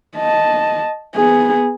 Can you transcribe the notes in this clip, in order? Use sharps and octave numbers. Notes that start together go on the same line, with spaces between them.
D#5 A5
B3 G#4